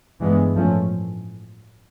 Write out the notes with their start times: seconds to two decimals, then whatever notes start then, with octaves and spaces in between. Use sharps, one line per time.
0.20 G2 E3 G#3 B3
0.55 A2 F3 A3 C#4